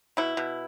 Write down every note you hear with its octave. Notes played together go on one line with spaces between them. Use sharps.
B2 E4
B2